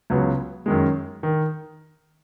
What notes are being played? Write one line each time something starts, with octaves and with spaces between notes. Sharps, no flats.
C#2 C#3 F#3 B3
F#2 D#3 G#3
D#3